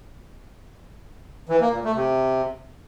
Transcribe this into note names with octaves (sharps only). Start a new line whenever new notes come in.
E3
A#3
A#2
A3
C3